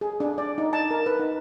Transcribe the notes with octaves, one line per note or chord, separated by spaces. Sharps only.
G#4
D4
D5
D#4
A5
A#4
B4
D#4